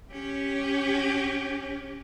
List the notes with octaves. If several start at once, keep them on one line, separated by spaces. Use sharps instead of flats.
C#4 G4